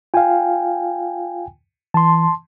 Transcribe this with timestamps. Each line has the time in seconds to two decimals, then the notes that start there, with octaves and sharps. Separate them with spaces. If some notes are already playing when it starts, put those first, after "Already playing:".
0.14 F4 F5 G5 G#5
1.94 E3 A5 C6